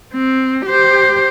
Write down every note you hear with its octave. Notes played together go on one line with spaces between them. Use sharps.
C4
G4 C5